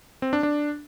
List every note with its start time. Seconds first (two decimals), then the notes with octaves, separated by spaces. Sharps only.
0.22 C4
0.33 D4
0.43 D4